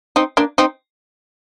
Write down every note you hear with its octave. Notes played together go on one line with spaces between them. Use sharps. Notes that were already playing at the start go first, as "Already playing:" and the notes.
C4 D#4
A#3 D4
C4 D#4